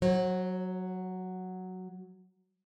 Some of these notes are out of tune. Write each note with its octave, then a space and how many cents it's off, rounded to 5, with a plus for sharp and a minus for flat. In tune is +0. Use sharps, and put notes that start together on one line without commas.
F#3 +0 C#5 -40